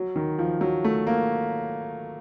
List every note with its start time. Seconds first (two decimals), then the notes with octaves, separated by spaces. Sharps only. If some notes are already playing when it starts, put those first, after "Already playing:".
Already playing: F#3
0.16 D#3
0.39 F3
0.61 F#3
0.84 A3
1.07 A#3